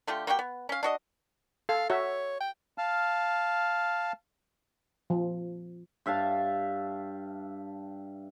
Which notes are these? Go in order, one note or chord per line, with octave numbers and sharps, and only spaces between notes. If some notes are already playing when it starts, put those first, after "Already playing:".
D3 A3 F4 G4
A#3 F#4 G4 G5
B3
C#4 F5
D4 F#4 D#5
A4 F5
F#4 C#5 E5
G5
F5 A5 F6
F3
G2 E5 F5 A5